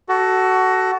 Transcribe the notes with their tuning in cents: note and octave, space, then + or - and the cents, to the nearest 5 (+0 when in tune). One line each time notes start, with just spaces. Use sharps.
F#4 +20 A4 +0